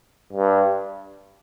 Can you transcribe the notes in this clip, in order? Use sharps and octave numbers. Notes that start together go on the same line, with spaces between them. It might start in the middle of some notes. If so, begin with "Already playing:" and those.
G2